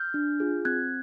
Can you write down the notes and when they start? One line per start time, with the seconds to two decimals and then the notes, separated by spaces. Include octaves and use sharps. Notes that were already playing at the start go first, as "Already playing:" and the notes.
Already playing: F6 G6
0.14 D4
0.40 F4 G#4
0.65 C4 F#6 G#6